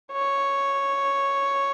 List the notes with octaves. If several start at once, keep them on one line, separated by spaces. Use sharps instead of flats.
C#5